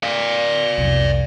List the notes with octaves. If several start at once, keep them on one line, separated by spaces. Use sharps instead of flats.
D5 F5
C2 F2